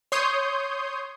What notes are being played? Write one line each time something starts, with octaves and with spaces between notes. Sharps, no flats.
C#5 C6 D#6 G6